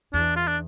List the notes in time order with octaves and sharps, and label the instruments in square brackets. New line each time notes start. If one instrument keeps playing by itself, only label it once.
[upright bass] E2 [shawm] D4
[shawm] F4
D4